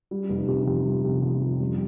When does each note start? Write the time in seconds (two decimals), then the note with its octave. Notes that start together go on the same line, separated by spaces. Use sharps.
0.11 G3
0.29 F1
0.48 C3
0.66 F2
0.85 G3
1.04 C3
1.22 F2
1.42 F2
1.59 G3